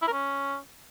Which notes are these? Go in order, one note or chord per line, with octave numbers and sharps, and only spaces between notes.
E4
A#4
C#4